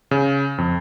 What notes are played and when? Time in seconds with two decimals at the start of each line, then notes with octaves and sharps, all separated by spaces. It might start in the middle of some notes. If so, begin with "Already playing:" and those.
0.11 C#3
0.58 F2